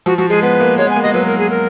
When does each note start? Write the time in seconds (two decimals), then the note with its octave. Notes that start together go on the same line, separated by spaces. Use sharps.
0.06 F3 F#4
0.18 F3 F#4
0.30 G#3 G#4
0.42 B3 B4
0.60 A#3
0.78 G#3 C#5
0.87 B3
0.90 G#5
0.96 A#3
1.02 G#3 D#5
1.14 F#3 B4
1.26 A#4
1.38 G#4
1.50 A#4